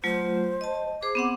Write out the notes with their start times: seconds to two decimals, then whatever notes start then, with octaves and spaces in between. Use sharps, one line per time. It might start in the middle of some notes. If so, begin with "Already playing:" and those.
0.04 F#3 A3 F4 C5
0.61 D#5 A5
1.02 G#4 C5 D6
1.15 B3 C4 F#5